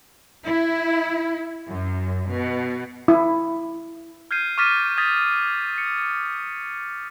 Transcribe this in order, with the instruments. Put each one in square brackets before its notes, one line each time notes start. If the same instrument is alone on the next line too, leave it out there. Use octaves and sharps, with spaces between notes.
[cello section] E4
F#2
B2
[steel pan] E4
[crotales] F6 G6 G#6 C7 D#7
C#6 D6 F6 A6 B6 D#7
D#6 G#6 A6 B6
C#7